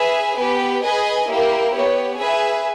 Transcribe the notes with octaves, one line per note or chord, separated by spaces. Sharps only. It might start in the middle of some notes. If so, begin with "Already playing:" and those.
Already playing: G#4 B4 E5 G#5
B3 G4 B4
G#4 B4 D#5 G#5
A#3 E4 G4 A#4
B3 G4 C#5
G#4 B4 E5 G#5